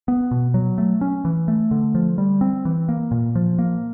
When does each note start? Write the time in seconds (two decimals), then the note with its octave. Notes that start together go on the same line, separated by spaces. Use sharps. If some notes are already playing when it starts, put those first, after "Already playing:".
0.08 B3
0.31 B2
0.54 F#3
0.78 A3
1.01 C#4
1.25 E3
1.48 A3
1.71 D3
1.95 F3
2.18 G3
2.41 C4
2.65 E3
2.89 A#3
3.11 A#2
3.35 F3
3.59 A#3